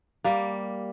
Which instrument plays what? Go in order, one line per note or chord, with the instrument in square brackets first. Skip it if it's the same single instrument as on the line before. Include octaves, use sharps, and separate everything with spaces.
[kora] G3 A#3